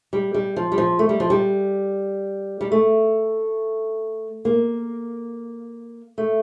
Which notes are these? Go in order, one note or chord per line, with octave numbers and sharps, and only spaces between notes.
G3
G3
F3
G3
F3
A3
G3
F3
G3
G3
A3
A#3
A3